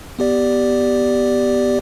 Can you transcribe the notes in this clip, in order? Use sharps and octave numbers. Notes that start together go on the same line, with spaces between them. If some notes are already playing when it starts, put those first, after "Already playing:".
B3 G4 D5